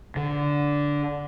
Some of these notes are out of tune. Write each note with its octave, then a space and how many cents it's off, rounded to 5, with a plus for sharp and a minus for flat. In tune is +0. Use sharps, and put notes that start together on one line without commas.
D3 -10